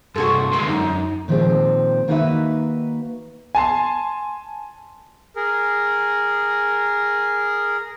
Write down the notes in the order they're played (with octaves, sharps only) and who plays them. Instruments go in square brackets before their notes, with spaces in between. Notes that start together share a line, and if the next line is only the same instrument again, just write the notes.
[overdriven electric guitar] G2 C3 [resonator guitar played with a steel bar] F#4 G#4 A4 [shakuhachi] C6
[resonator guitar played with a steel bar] E2 G2 D3 [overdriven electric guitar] G#3 A#3
[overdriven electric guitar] F#2 [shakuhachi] D#4
[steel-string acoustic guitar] A#2 D#3 F3 G3 G#3 C4
D#3 A#3 D#4 F#4 B4 E5
[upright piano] G#5 A5 C6
[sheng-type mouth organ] G#4 A#4